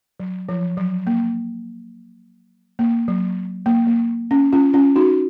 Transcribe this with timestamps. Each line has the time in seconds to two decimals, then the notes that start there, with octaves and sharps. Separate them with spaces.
0.20 F#3
0.49 F3
0.77 F#3
1.07 A#3
2.79 A#3
3.08 F#3
3.66 A#3
3.87 A#3
4.31 C#4
4.53 C#4 F4
4.73 C#4 F4
4.96 D#4 F#4